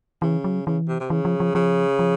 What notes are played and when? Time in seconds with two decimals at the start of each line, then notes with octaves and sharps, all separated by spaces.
0.22 C#3 E3
0.44 F#3
0.67 C#3 E3
0.88 C3
1.00 C3
1.10 C#3 E3
1.25 F3
1.40 F3
1.55 C#3 F3
1.99 F3